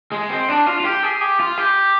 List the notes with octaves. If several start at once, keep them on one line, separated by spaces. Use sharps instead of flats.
G#3
C4
D4
F4
F4
G4
G#4
G4
F4
G4